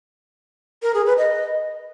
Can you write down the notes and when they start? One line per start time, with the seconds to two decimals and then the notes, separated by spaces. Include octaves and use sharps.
0.83 A#4
0.94 G#4
1.06 B4
1.18 D#5